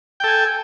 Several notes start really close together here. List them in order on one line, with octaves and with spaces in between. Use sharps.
G5 A4 G#5